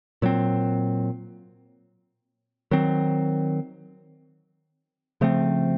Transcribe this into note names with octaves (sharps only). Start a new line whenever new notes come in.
A#2 F#3 C4
D#3 F#3 C4
C#3 F3 A3 C4